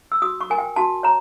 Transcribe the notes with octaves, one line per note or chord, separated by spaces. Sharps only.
E6
F#4 D#6
C#6
A#4 G#5
G5
F#4 A5
C#5 A#5